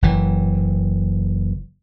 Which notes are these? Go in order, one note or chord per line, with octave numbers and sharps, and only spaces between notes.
F#1 E3